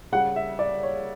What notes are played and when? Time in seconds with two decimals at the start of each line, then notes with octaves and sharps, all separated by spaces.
0.12 C#3 G3 F#5
0.36 E5
0.59 D5
0.83 C#5